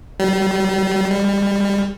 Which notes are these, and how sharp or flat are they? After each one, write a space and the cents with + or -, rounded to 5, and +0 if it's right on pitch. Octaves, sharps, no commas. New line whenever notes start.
G3 -35
G3 +30